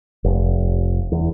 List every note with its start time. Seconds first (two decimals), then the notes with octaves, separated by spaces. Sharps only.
0.24 F1
1.12 E2